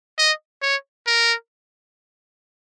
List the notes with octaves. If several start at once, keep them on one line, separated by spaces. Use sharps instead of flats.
D#5
C#5
A#4